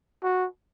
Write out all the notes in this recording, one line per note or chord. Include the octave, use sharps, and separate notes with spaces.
F#4